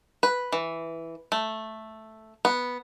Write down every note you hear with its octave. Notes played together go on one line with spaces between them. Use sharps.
B4
E3
A3
B3